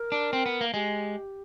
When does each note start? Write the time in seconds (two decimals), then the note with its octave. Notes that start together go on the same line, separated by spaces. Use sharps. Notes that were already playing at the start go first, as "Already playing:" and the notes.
Already playing: A#4
0.12 D4
0.33 C4
0.46 B3
0.61 A#3
0.74 G#3 G4